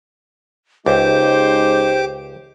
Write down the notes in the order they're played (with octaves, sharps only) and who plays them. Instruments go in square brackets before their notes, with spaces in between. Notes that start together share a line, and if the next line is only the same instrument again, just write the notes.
[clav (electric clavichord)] C#2 [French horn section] C#3 G#3 D#4 [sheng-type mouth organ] G4 D6 [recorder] C5